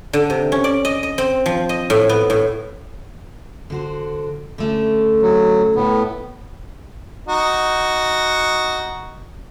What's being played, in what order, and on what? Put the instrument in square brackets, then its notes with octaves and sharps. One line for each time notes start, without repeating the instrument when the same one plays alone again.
[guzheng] D3
C3
C#4
D5
D#5
D#5
C4
F3
D#5
A2
B3
A2
[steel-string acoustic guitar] D3 F#4 C5
D3 A3 C#4
[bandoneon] F#3
A2 B3
[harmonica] D#4 F#4